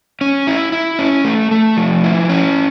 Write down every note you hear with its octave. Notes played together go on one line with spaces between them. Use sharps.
C#4
E4
E4
C#4
A3
A3
F3
E4
C#4